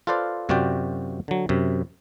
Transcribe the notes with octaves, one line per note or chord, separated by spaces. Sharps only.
F4 A4 B4 C5 D5 F5
F#2 C3 F4 F#4 D5 G5
D3 F#3
F#2 C3